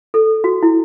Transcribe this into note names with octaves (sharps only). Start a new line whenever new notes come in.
A4
F#4
E4